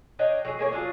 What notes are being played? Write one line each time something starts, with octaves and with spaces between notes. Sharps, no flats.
D4 C#5 D#5 G5
F#3 G#4
A#3 G#4 C#5
F#3 D4 F4 G#4